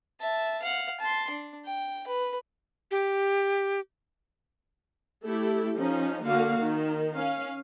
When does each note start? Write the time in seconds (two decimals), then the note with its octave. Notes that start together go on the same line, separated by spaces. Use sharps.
0.20 E5 A5
0.62 F5 F#5
1.00 A5 C6
1.30 D4
1.65 G5
2.07 B4
2.91 G4
5.25 A3 E4 G4 A4
5.78 F3 C#4 D#4
6.23 D3 A#3 F#4 F5
6.60 D#3
7.16 C#4 F5